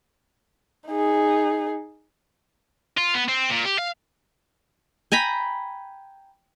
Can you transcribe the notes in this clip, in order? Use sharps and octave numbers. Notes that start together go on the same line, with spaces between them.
D#4 G#4
F4
B3
C4
A#2
G4
F5
G5 G#5 A#5 B5